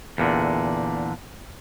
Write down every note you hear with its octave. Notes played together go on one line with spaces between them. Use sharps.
E2 A#2 D3